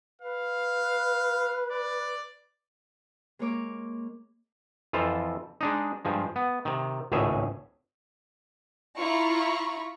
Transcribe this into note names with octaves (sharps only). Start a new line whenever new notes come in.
B4 F5
D5
G#3 A#3 A#4 C#5 D6
F2 E3 F4 A4 C5
G#3 D4 D#4
G2 F3 G#3
B3
C3 D#3
G#1 C#2 A2 G#4 E5
E4 F4 A#5 B5 C#6